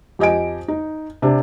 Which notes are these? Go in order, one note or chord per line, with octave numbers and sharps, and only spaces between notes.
F2 G4 D#5 G#5 D7
D#4
C3 D4